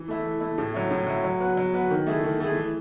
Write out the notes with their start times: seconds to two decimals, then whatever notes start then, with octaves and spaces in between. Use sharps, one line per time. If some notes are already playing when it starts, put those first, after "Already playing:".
Already playing: E3
0.08 A3 E4
0.24 E3
0.40 A3 E4
0.58 A2
0.74 F#3 C#4 E4
0.90 A2
1.07 F#3 C#4 E4
1.24 F#3
1.40 B3 F#4
1.57 F#3
1.74 B3 F#4
1.91 D#3
2.06 A3 E4 G#4
2.24 D#3
2.40 A3 E4 G#4
2.56 E3